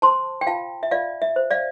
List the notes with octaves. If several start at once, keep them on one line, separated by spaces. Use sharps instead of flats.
C5 A5 C6
G5
F4 F5 A5
E5
F4 D5 F5
E5
C5
D5 F5